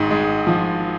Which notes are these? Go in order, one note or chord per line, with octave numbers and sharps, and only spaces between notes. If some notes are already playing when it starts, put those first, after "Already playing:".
Already playing: G#1 G#2
G#3
F3